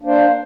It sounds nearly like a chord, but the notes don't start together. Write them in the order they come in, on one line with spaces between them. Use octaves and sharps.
D4 A#3 C5